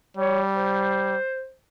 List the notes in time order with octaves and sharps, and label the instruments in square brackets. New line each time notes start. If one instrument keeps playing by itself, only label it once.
[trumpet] G3 [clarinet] C#5
[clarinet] C5